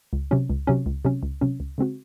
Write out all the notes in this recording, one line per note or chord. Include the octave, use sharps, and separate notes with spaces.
C#2
C3 F#3 C#4
C#2
C3 F#3 C#4
C#2
C3 F#3 C#4
C#2
C3 F#3 C#4
C#2
C#3 G#3 C4 F#4